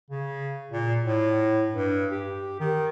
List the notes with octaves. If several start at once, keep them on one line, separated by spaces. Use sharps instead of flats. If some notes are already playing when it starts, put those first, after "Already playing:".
C#3
A#2
A2
G2
G4
D#3